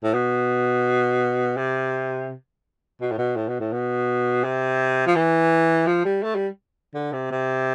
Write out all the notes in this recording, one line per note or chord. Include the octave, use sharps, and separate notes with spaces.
A2
B2
C3
B2
A2
B2
A2
B2
A2
B2
C3
F3
E3
F3
G3
A3
G3
D3
C3
C3